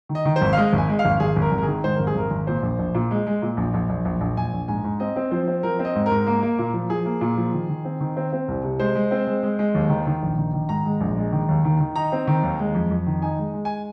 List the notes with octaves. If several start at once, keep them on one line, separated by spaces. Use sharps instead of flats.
D#3
D#5
D#3
C5
G#1
F5
G#3 D#5
G#1
G#5
G#3
F5
G#1
G#1 G#4
G#1
A#4
G#1
A#4
D#3 G#4
G#2 C5
G#1 A#4
G#4
G#1 A#4
G#1
A#2 C5
A#1
A#1
A#2
G#3
G#3
A#2
A#1
A#1
A#1
A#1
A#1
A#1 G#5
A#1
G#2 G#5
G#2
C4 D#5
C4
F3 C5
C4
F3 A#4
C4
D#5
G#2
G#2 A#4
A#3
A#3
A#2
F3
F3 G#4
A#3
A#2
F3
D#3
D#3
C4
D#3
C4
C4
C2
C3
G#3 C5
G#3
C4
G#3
G#3
G#3
D#2
D#3
D#3
A#1
D#3
D#3
G#2 A#5
G#3
A#1
G#3
D#3
D#2
D#3
D#3
D#4 A#5
C4
D#3
D#2
G#3
F2
F2
D#3
D#4 G#5
G#3
G#3
G#5